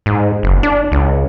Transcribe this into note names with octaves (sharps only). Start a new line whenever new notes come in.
G#2
F#1
D4
C#2